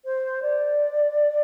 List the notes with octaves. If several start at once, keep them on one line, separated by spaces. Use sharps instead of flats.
C5
D5